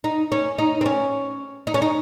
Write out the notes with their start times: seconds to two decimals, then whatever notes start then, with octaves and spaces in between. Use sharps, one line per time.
0.04 D#4
0.32 C#4
0.58 D#4
0.81 C4
0.86 C#4
1.67 D#4
1.74 C#4
1.82 D#4